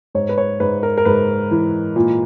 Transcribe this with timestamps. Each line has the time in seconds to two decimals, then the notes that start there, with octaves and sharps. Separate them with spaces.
0.15 G#2 C#5
0.29 B4
0.38 C#5
0.60 G#2 B4
0.83 A#4
0.98 A#4
1.05 G#2 B4
1.51 E3
1.96 A#2